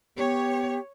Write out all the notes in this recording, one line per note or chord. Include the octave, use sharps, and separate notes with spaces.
B3 G4 C#5